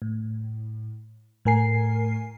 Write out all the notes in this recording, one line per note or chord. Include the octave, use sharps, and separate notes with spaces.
A2
A2 A3 A#4 G#5 C7